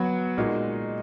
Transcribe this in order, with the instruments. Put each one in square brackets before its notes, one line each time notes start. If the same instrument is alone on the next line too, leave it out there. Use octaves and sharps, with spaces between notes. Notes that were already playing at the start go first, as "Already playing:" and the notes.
Already playing: [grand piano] F#3 B3 F#4
A#2 G#3 D#4 F#4